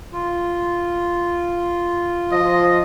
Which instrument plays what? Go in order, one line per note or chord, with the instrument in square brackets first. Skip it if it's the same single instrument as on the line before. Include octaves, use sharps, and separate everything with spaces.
[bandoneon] F4
[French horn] F3 [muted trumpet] D#5